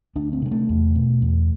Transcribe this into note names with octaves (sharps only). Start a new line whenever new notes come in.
D2 D4
C4
C3 G#3
A3
E2
B2
E2